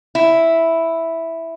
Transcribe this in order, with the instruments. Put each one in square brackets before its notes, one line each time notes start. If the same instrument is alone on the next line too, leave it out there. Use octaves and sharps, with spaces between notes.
[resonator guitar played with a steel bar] E4